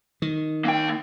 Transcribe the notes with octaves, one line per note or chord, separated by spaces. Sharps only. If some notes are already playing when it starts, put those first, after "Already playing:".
D#3
A#3 G5